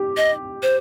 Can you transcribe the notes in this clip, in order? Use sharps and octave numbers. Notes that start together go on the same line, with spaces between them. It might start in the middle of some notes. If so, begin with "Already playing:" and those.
Already playing: G4
D#5
C5